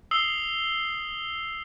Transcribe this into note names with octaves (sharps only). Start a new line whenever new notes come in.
D#6 E6 C7 F#7 G7